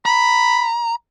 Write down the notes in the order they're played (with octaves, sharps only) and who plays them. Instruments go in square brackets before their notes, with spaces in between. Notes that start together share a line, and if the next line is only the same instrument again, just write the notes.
[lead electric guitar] A#5 [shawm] B5